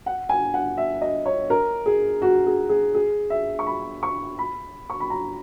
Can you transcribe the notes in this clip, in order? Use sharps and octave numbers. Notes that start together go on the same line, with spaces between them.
F#5
G#5
F#5
E5
D#5
C#5
A#4
G#4
F#4
G#4
G#4
G#4
E5
C#6
B5
C#6
B5
C#6
B5
A#5